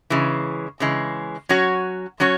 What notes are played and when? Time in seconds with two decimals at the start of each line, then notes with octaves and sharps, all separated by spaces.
0.10 C#3 E3 G#3
0.80 C#3 E3 G#3
1.49 F#3 C#4 F#4 C#5
2.20 F#3 C#4 F#4 C#5